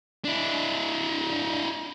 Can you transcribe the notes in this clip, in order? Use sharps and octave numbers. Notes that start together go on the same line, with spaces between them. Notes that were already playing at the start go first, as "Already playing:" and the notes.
D4 E4